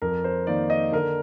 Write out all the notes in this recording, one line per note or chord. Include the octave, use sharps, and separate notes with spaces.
F2 A#4
C5
D#3 A#3 D5
D#5
D3 A#4